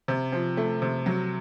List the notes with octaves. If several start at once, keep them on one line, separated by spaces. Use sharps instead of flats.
C3
F3
A3
C3
F#3